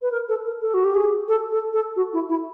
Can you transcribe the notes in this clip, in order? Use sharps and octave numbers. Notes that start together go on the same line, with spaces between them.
B4
A#4
A4
A#4
A4
F#4
G4
G#4
A4
A4
A4
F#4
E4
E4